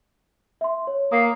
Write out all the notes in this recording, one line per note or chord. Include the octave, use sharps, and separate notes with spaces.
E5 C6
C#5
A#3 D#6 C7